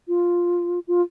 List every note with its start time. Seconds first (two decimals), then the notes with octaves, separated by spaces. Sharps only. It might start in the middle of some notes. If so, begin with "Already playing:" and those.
0.08 F4
0.87 F4